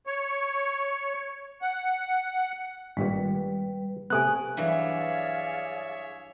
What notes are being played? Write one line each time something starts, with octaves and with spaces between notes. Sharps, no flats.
C#5
F#5
G#1 G2 A#2 G3 B4
C3 A3 B3 G#5 D#6 F#6
G2 E3 F#3 G#4 C#5 D5 E5 F5